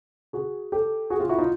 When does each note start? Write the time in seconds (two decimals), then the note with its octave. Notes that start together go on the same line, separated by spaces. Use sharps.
0.33 F#4 G#4
0.72 G4 A4
1.10 F#4 G#4
1.20 F4 G4
1.29 E4 F#4
1.39 D#4 F4